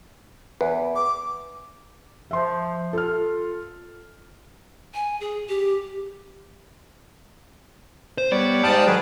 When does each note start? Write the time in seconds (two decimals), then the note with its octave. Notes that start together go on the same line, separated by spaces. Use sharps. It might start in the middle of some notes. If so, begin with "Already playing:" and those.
0.61 E2 B4
0.95 D6
2.31 F3 E5 C6
2.93 F4 A4 F6
4.94 G#5
5.20 G#4
5.49 G4
8.18 C5
8.32 G3 B3 C#5 D5
8.63 G#2 G4 F5 G5 A5 D#6
8.87 D#3 F#3 G#4 B4